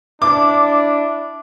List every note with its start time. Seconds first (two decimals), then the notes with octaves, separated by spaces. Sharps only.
0.22 D4 E4 D6